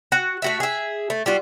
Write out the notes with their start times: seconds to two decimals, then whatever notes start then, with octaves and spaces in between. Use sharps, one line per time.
0.12 F#4
0.42 A3 F#4 E5
0.60 G#4 E5
1.10 A3
1.26 G3 F4 F#4